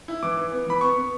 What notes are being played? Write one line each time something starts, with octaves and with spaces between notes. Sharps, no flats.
E4
E3 D6
E3
B3
E3 B5
B3 C#6
B3